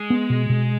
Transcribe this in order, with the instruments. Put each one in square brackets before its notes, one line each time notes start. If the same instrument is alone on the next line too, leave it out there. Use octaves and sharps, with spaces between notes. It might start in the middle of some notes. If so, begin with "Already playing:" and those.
Already playing: [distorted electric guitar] G#3
[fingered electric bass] B3
B2
B2